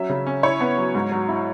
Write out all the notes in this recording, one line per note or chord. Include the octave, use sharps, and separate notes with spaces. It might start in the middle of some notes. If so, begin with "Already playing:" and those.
Already playing: F#3 C#4 E5
C#3
C#4
E4 C#5
B3
F#3
G#2
F#3
E4